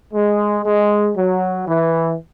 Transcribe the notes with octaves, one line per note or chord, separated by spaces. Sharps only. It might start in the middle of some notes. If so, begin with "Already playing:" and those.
G#3
G#3
F#3
E3